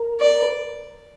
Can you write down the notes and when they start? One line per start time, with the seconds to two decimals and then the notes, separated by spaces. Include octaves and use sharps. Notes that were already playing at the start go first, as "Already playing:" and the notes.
Already playing: A#4
0.21 D5
0.42 B4